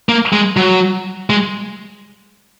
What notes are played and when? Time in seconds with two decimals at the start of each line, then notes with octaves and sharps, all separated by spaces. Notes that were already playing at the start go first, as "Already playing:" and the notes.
0.09 A#3
0.33 G#3
0.57 F#3
1.30 G#3